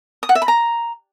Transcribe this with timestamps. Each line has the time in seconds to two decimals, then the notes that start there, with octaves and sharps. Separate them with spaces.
0.23 D#6
0.29 F#5
0.35 E5
0.42 B5
0.48 A#5